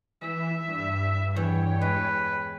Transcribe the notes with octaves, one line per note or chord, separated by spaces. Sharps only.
E3 E5
G2
E2 C#5 G5
G#3 B4